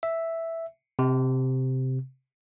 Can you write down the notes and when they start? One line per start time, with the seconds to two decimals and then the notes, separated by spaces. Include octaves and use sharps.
0.03 E5
0.99 C3